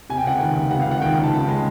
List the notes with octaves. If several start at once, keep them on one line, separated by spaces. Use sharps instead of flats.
C3 G#5
G5
C#2 F#5
G5
D#3
C#2
C3 F#5
F5
C#2 F#5
D#3 G5
G5
C#2
A5
C#3
G#3